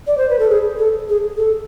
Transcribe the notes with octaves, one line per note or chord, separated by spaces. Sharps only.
D5
C5
B4
A4
G#4
A4
G#4
A4